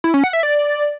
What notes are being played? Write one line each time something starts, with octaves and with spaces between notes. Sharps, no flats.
E4
C#4
F#5
E5
D5